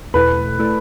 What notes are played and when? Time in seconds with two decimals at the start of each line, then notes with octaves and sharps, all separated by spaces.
0.14 E2 B2 A3 E4 A4 B4
0.59 A3 E4 A4 D5